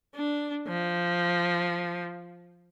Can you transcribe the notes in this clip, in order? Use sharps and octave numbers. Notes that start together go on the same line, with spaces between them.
D4
F3